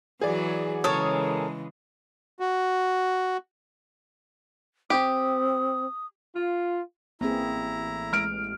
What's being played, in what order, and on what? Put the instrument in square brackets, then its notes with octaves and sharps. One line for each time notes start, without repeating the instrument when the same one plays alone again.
[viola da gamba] E3 F#3 F#4 [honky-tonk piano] G#4 D5
[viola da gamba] C#3 E3 G#3 [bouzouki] A4 A#4 C#5 [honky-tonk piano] D#6
[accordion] F#4
[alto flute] C4 [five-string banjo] G4 [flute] D#6
[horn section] F4
[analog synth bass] A1 [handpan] A#3 C4 G#4 [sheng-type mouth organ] E4 A#5
[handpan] G#3 [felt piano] F6 D7